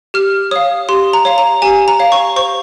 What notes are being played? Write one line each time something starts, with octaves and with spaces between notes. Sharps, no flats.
G4 F6
C#5 F5 D#6
G4 C6
A#5
C#5 F5
A#5
G4 G#5
A#5
C#5 F5
C#6
C5 C#6